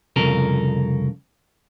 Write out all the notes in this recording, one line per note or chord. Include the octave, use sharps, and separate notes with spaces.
C2 F2 C#3 A4 A#4